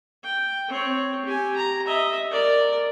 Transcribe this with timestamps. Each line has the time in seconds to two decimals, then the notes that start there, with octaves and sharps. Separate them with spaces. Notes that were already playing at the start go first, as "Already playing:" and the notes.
0.24 G5
0.69 C4 C#5
1.25 G4 G#5
1.56 A#5
1.87 D#5 E5
2.31 A#4 D5